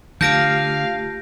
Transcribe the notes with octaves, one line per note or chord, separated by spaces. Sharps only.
D3 A3 F4 G4 F5 G6 A#6 D7